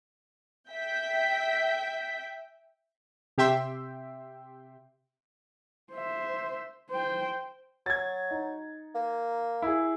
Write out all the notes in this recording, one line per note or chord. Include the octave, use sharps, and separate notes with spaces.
E5 G5 G6 B6
C3 G4 E5 G5 C6
C5 E5
C5 G5
F#3 G#6 A6
D#4
A#3
E4 G#4